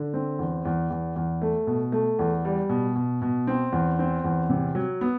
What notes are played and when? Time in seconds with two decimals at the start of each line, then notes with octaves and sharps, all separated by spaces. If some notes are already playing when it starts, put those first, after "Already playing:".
Already playing: D3
0.14 C4
0.39 E2
0.65 E2
0.90 E2
1.16 E2
1.42 A3
1.67 B2
1.92 A3
2.19 E2
2.45 G3
2.69 B2
2.95 B2
3.22 B2
3.47 C4
3.72 E2
3.99 C4
4.24 E2
4.50 C3
4.75 F#3
5.01 B3